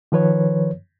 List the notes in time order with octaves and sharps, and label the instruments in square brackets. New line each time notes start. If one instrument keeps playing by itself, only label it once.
[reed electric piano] D#3 F3 B4 C#5